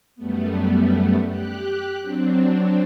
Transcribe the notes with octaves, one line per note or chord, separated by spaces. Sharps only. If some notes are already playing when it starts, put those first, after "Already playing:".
F#2 G3 A3 B3
G4 F#6
F#3 C4 D4